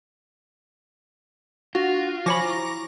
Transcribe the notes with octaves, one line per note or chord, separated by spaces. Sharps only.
D4 F4 F#4
F3 C5 C#5 G#5 B5 C#6 D6 A#6
E4 A#5